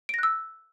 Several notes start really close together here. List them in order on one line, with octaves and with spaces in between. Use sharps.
D7 A#6 F#6 E6